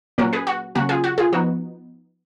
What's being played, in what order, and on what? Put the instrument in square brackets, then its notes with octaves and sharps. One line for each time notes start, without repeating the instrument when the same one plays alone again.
[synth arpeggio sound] A#2 F#3 A#3 C#4 F#4 A#4
G#4 B4
F#4
C#3 F#3 A#3 C#4 F#4
F4 G#4
F#4
F4 G#4
F3 B3 D#4 F#4